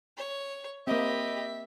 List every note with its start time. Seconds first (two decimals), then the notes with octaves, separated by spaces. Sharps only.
0.17 C#5
0.87 A#3 C4 G4 D#5 E5 B5